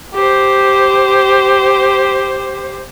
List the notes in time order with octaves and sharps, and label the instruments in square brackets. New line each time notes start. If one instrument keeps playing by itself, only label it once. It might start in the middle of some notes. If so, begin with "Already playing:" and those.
[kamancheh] G4 C5